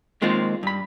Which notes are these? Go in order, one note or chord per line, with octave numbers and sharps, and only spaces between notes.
D#3 G#3 A#3 C4 F4
G2 B5